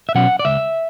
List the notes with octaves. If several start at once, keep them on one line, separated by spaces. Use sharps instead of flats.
E5
B2 F#3 C#4 F#5
D5
C#2 E5